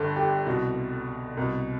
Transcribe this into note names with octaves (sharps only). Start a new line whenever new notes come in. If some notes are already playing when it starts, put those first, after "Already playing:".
Already playing: G1 G2 D3 A4
G4
C2 B2 F#4
C2 B2